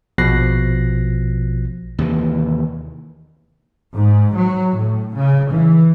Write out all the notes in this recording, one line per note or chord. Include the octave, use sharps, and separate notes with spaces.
A#1 B2 F3 F#6 A#6 C7
D#2 C3 E3
G#2
F#3
A2
C#3
E3